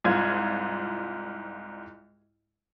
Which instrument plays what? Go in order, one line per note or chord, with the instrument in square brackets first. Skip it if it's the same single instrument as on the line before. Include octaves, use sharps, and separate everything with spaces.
[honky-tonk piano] C2 G#2 F4 C5 G#6